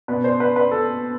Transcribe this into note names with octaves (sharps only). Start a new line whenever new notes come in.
B2 B4
C5
B4
B4
A4